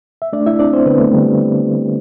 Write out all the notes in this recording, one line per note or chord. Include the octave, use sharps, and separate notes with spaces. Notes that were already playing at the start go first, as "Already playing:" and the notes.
E5
A3 D4 D5
E4 E5
C4 D4 D5
C4 C5
D3 B3 B4
A3 A4
D3 G3 G4